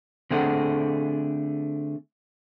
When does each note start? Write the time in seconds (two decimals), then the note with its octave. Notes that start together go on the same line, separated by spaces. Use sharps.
0.31 D3 A3 C4 G#4 A4 F#5